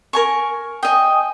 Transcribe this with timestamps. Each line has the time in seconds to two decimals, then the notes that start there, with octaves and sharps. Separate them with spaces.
0.13 A#4 G#5 C#6
0.83 D#5 G5 G#5 D#6